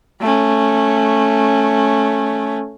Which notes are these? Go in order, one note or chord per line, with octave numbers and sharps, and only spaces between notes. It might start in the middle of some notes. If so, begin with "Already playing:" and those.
A3 C#4